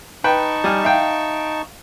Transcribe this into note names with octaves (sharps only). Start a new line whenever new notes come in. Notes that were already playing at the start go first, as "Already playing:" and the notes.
D#4 B4 G5 A5 C#6
G3 G#5 F6
E5 F5 G5